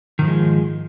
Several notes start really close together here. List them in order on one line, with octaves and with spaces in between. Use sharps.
D#3 G#2 F3 G#3